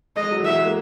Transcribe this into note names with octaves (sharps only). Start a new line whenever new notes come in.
G#3 D#5
F#3
E3
F#3 E5
G#3
A#3